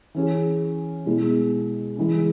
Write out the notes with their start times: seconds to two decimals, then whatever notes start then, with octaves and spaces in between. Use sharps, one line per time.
0.14 E3 C#4 G#4
1.06 B2 G#3 E4 G#4
1.97 C#3 E3 G#3